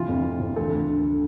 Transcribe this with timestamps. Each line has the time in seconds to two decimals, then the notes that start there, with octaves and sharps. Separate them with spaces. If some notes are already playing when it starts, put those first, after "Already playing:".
Already playing: C3 E3 F4
0.08 F2
0.24 E3
0.40 F2
0.56 D2 A4
0.72 D2
0.88 D3